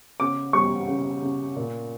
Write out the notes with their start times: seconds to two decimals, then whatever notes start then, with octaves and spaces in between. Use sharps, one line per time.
0.20 C#3 D6
0.53 G3 C#6
0.88 C#3
1.22 C#3
1.56 A#2